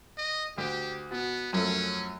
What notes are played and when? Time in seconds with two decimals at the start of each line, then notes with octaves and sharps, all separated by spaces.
0.18 D#5
0.58 D2 G4
1.11 B2 B3
1.53 F#2 F3 A3 C#4